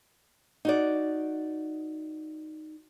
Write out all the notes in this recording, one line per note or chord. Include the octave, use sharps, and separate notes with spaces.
D#4 F#4 D5